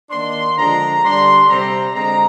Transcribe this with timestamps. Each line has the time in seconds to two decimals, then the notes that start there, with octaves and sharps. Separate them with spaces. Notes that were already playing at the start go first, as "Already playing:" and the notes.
0.11 D#3 A#3 D4 C6
0.57 D3 F3 G#3 D4 A#5
1.03 D3 G3 D4 C6
1.48 C3 G3 C4 A#5
1.94 D3 G#3 C4 A#5